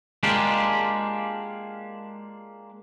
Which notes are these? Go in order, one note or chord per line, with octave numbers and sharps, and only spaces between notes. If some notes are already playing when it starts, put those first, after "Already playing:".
G#3 A#3 D4 F4 G4